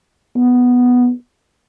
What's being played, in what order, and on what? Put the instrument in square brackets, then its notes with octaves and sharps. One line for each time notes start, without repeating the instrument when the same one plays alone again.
[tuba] B3